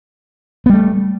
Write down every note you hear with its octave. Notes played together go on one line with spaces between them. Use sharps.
G3 A3 B3